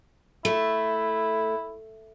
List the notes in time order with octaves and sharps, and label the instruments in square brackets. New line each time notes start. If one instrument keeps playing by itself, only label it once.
[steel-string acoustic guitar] A3 [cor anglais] E4